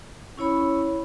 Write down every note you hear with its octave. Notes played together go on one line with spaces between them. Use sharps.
C#4 E4 C#5 B5